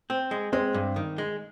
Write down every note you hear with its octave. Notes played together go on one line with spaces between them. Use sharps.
C4
G#3
G#3 C4
G2
D#3
G#3